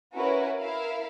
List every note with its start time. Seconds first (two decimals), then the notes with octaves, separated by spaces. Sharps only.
0.13 C#4 E4 F#4 A#4 B4
0.59 E4 A#4 E5 F5